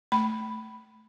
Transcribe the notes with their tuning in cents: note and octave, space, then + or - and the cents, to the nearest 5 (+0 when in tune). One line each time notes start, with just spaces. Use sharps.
A3 +0 B5 +0